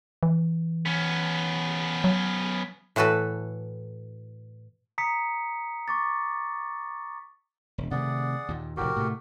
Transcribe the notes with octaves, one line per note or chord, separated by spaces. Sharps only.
E3
B3 C#4
F#3
A2 E3 F#4 A4 B4
A#5 D#6 B6 C#7
C#6 D6 A6
E1
C3 D#3 A3 G#4 D5 F#5
D#2 A#2
F1 A2 C3 F#4 G4 A#4
A2 C3 A3